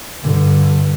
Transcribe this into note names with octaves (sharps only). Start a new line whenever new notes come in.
G2 D3